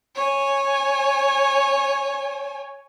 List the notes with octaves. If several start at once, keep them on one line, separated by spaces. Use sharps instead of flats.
C#5 G#5